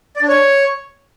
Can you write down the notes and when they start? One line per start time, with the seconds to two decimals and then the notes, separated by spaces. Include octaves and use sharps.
0.16 D5
0.22 D4
0.28 C#5